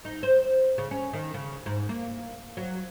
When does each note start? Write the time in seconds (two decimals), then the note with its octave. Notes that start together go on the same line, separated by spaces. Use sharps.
0.05 D#4
0.23 C5
0.78 C#3
0.91 C#4
1.13 D#3
1.34 C#3
1.66 G#2
1.89 A#3
2.57 F#3